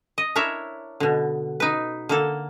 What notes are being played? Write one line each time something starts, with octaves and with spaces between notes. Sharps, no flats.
D#5
D4 E4 A#4 C#5 E5
B2 D3
D#4 B4
D3 A#3 A4